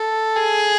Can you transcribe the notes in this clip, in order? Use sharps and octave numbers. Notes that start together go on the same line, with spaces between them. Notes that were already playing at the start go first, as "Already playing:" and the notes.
Already playing: A4
G#4